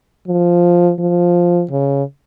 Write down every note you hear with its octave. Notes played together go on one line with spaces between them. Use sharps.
F3
F3
C#3